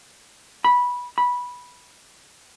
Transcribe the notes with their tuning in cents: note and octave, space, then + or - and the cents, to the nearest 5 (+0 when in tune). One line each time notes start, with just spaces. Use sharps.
B5 -15
B5 -10